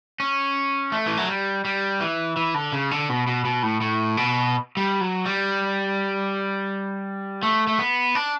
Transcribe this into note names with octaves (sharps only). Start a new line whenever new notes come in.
C#4
A3
E3
F#3
G3
G3
E3
E3
D3
C#3
D3
B2
B2
B2
A2
A2
B2
G3
F#3
G3
A3
A3
B3
D4